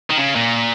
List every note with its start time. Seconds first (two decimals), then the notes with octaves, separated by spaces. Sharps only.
0.10 D#3
0.18 C#3
0.36 A#2